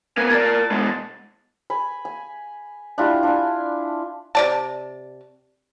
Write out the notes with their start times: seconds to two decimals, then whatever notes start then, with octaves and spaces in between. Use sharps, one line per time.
0.17 A#3 B3 G#5
0.31 A#4 D5 A5
0.71 B2 G#3
1.70 G#5 B5
2.05 G#5
2.98 D4 E4 F4 G4
3.23 D4 G#5
4.35 C3 D5 A5